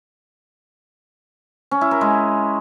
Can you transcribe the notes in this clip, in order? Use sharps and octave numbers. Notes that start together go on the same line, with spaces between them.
C#4
E4
A#4
G#3